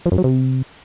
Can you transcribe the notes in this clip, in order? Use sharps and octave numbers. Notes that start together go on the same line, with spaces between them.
F3
F#2
F#3
C3